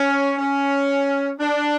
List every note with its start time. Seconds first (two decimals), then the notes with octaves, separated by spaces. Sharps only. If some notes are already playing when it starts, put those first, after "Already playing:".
Already playing: C#4
0.37 C#4
1.40 D4